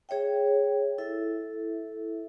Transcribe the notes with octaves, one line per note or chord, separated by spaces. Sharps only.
G#4 C#5 E5 G5
E4 A4 E5